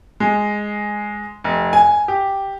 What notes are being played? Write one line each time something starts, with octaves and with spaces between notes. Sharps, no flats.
G#3
F1
G#5
G4